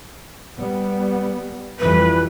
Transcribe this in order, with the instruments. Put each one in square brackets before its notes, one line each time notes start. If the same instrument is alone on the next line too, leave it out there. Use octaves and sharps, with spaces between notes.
[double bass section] G3 B3
[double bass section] F2 E3 G3 [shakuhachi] B4